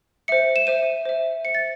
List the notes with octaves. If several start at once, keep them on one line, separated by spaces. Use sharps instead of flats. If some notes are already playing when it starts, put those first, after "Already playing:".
C5 E5 C#7
E7
C5 E5 D#7
C5 E5
C5 E5 C#7
A6